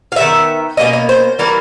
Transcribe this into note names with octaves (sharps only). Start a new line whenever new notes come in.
F5
D#3 G#3 B3 E5
B2 G3 A#3 C#4 D#5
D#5
C5
E3 G3 A#3 A#4